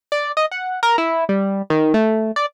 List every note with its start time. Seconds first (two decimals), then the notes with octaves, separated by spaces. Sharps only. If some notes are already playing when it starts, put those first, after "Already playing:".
0.12 D5
0.37 D#5
0.51 F#5
0.83 A#4
0.98 E4
1.29 G3
1.70 D#3
1.94 A3
2.36 D5